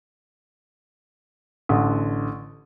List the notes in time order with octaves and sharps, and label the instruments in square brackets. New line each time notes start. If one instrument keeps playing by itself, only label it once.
[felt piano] A1 D3